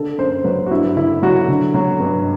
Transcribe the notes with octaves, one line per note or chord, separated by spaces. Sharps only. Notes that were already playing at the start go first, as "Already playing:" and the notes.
Already playing: D3 A4
F#2 C5
F#3 B4
F#4
G2 E4
D3 E4
F#3 F#4
D3
F#3
G2